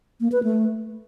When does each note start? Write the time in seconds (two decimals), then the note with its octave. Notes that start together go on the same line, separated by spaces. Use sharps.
0.20 A#3
0.32 B4
0.43 A3